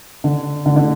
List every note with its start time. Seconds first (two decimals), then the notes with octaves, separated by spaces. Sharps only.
0.24 D3
0.66 D3
0.76 D3